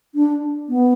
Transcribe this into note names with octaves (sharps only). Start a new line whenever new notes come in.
D4
B3